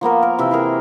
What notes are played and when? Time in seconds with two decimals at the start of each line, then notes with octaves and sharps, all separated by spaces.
0.01 F3 A#3 B3 A#4
0.23 A#4
0.38 C3 E3 E5
0.51 E4 G#4 A#4